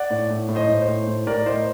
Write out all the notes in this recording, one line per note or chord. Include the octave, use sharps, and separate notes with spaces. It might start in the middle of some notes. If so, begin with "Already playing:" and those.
Already playing: D5 F#5
A2
A2
A2
C5 D#5
A2
C5
A2
A2
A2 A#4 D5
A2 C5 D#5